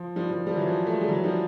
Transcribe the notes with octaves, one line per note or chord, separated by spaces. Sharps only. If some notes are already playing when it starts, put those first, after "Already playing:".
Already playing: F3
F3 G3
F3
F3 G3
E3 F#3
F3
A3
G#3
G3
E3 F#3
F3 G3